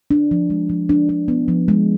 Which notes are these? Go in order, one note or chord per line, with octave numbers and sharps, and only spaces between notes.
D4
F3
G#3
F3
D4
D4
B3
F3
G#3